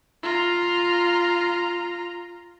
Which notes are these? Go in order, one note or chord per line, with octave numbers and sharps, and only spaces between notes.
F4 A#5